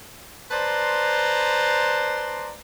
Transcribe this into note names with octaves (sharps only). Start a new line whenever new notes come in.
B4 C5 D5 A5 A#5 C6